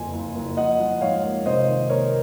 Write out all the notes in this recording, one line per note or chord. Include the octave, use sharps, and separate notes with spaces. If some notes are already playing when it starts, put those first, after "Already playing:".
Already playing: F#1 F2 G#5
F#1
F#1
F3 D#5 F#5
F3
G#2 C#5 F5
A#3
C3 C5 D#5
D#3
A#3 A#4 C#5